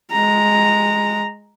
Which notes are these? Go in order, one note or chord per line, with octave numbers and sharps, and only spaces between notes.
G#3 A#5